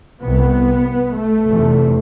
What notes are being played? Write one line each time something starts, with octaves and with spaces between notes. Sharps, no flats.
C2 C3 B3
A3
F1 E2 C3